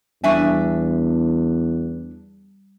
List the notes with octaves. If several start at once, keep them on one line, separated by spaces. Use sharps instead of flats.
E2 G3 D4 E5 G#5 C#6